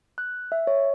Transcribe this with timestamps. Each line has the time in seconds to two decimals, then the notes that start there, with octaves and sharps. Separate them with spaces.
0.18 F#6
0.52 E5
0.67 C#5